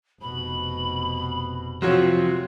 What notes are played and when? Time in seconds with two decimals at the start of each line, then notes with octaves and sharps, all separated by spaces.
0.22 F1 B2 B5
1.82 C3 F3 F#3 F4 F#4 C#5